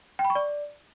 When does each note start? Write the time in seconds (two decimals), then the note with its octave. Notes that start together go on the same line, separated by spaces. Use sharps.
0.19 G5
0.25 B5
0.30 C#6
0.35 D5